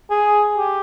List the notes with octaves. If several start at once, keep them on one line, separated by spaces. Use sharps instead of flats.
G#4
G4